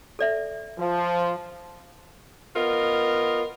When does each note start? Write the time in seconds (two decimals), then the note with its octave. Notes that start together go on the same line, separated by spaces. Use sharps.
0.19 A4 D5 E5
0.78 F3
2.56 B3 F4 A#4 D#5